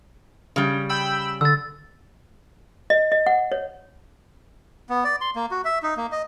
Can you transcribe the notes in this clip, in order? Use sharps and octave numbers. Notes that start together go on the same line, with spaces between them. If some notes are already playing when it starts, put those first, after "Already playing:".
C#3 G3
G5 B5 E6
D3 E6 A6
D#5
D#5
F#5
C#5
B3
D5
C6
A#3
F#4
E5
D#4
A#3
D#5